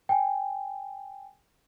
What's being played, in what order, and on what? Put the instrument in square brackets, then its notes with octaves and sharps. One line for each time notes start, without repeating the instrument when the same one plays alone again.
[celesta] G5 G#5